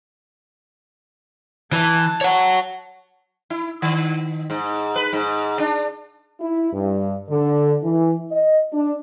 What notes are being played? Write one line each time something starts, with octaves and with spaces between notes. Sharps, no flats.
E3 A5
C#5 F#5
E4
D#3
G#2
B4
G#2
D4
E4
G2
D3
E3
D#5
D4